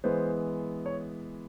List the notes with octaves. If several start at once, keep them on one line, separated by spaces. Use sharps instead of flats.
E3 G#3 B3 C5
C#5